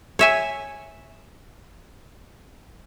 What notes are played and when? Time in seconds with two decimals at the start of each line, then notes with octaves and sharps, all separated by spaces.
0.19 C#5 E5 G#5